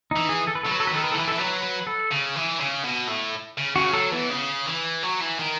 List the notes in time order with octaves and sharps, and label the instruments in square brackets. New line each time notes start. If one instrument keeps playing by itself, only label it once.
[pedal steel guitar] D#4
[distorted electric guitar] E3
[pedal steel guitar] G#4
A4
B4
[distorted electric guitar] F#3 [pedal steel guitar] A4
[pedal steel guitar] B4
A4
[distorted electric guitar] D#3 [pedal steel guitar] B4
[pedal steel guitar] A4
B4
[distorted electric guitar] E3 [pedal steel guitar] A4
[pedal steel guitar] B4
[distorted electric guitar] E3 [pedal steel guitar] A4
[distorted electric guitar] F#3 [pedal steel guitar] B4
[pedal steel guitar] B4
A4
[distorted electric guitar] C#3
E3
C#3
B2
A2
C#3
[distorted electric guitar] C#3 [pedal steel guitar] F#4
[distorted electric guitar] F#3 [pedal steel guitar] A4
[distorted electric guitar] E3 [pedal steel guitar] B3
[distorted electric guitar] C#3
E3
F#3
E3
D#3